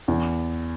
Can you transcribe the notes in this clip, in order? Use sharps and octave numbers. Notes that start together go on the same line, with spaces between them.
E2